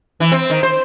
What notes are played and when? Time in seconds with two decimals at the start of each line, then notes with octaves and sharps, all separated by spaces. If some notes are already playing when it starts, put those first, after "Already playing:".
0.20 E3
0.32 C4
0.50 D#3
0.63 C5